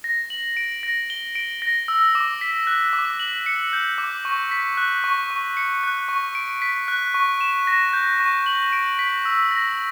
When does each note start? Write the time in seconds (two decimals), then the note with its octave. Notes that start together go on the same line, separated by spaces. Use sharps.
0.04 A#6
0.30 F#7
0.57 D7
0.83 A#6
1.10 G7
1.35 D7
1.62 A#6
1.88 E6
2.15 D6
2.41 B6
2.67 F#6
2.93 D6
3.20 F#7
3.46 C#7
3.73 G6
3.98 D6
4.25 C#6
4.51 B6
4.77 F#6
5.04 C#6
5.30 C#6
5.57 C#7
5.83 F#6
6.09 C#6
6.35 D7
6.62 B6
6.88 F#6
7.14 C#6
7.41 E7
7.67 A#6
7.93 G6
8.20 C#6
8.46 F#7
8.73 D7
8.99 B6
9.25 E6
9.51 A#6